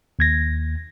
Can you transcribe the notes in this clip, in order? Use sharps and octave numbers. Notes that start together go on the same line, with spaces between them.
D#2 G#6 A#6